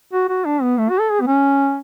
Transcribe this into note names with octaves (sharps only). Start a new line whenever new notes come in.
F#4
F#4
D4
B3
A3
F#4
A4
G#4
B3
C#4